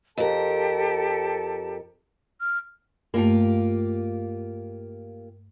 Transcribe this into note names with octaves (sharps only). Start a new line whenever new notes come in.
F2 G4 A4 A#4 A5
F6
G2 A3 A#3 F4 G4